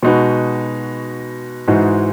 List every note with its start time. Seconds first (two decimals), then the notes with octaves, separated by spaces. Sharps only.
0.03 B2 G#3 D#4 F#4 B4
1.67 G#2 E3 G#3 D#4 F#4